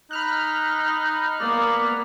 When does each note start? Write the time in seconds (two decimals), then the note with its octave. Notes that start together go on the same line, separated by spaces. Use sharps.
0.11 D#4 B5 F6 F#6
1.40 A#3 B3 D5